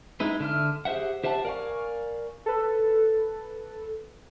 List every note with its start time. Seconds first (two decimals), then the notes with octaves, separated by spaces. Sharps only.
0.20 G#3 D#4 E4 B4
0.40 D3 E5 F6
0.85 G4 G#4 C5 E5 F#5
1.24 G4 C5 E5 F#5 A5
1.45 A#4 D5 F5 G#5 C#6
2.46 A4 B4